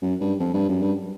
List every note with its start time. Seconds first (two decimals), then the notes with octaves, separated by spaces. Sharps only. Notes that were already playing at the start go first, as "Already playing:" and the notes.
0.02 F#2
0.21 G2
0.40 F2
0.54 G2
0.69 F#2
0.82 G2